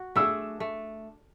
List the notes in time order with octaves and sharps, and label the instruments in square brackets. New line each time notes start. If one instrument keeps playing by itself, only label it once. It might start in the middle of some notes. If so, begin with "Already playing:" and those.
Already playing: [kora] F#4
[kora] A3 D4 G#4 [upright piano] E6
[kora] A3